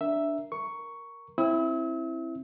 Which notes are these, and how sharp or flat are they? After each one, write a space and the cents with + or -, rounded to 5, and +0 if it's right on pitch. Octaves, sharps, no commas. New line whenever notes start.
D4 +0 A#4 +0 E5 +0
A#4 +0 C#6 +5
C4 +25 E4 +0 E6 -45